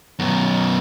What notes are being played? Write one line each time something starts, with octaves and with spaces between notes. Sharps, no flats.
F#2 B2